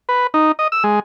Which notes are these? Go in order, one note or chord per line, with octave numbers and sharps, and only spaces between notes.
B4
D#4
D#5
E6
G#3